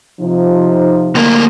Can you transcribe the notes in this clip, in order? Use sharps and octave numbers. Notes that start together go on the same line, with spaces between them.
C3 F3 D#4
D2 A#3